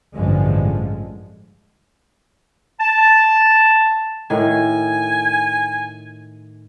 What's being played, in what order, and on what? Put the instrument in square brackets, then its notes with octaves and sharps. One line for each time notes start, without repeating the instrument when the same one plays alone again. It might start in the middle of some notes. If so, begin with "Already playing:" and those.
[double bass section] A1 G2 D3 F3 G#3
[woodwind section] A5
[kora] A2 D#3 [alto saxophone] G#5